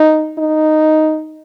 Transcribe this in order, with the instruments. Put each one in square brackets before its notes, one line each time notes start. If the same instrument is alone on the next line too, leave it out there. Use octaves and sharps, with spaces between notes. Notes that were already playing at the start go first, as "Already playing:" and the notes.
Already playing: [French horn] D#4
D#4